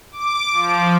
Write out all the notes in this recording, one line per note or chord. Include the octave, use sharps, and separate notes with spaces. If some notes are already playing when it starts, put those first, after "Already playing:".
D6
F3